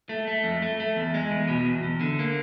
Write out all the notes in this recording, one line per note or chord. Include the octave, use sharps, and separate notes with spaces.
A3
A3
F2
A3
A3
E2
G#3
E2
B2
E2
E2
D3
A#3